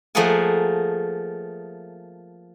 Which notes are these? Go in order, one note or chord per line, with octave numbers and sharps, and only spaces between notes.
F3 A3 A#3 G#4 F#5 G#5